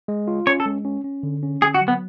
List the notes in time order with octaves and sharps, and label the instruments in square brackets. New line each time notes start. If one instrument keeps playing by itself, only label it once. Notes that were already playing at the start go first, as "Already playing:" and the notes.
[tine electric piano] G#3
F4
[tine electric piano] C#4 [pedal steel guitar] C#5
[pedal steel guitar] A4
[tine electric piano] G#3
C#4
C#4
D3
C#4
[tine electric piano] D3 [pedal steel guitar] G#4
[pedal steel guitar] F#4
[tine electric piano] F#3
[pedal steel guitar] B3